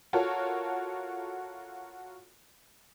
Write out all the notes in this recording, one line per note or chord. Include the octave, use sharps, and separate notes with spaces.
F4 F#4 A4 A#4 C#5